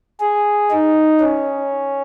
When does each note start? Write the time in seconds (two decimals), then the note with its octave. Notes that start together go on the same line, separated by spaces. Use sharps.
0.20 G#4
0.71 D#4
1.20 C#4